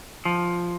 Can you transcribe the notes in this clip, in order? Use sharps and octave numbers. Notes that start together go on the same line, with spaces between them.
F3